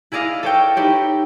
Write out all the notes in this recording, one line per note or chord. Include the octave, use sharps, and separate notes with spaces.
E4 G#4 D5 D#5 F5
A4 C#5 G5
D#4 E4 G4 C#5